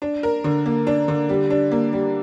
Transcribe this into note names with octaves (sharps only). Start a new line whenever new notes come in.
D4
A#4
D3
A#3
D4
D3
G3
D4
A#3
G3